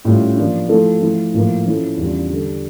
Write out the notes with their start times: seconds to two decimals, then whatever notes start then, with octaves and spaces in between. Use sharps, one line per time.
0.05 A2 G3 C#4 F4
0.36 F3 A#3 D4
0.68 F3 A3 E4 A4
1.01 F3 A3 E4
1.33 A2 F3 A#3
1.66 F3 C#4 E4 A4
1.97 E2 C#3 G3 D4 F4
2.30 D3 G3 D4 A4